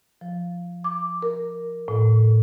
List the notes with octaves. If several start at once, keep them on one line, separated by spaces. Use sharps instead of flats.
F3
D6
A#4
A2